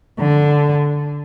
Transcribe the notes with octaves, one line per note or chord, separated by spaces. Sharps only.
D3